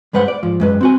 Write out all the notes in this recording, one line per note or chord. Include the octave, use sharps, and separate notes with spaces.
G2 G#3 B4 C5 F#5
D5
G#2 F3
F#2 G#3 B4
C4 F#4 G#5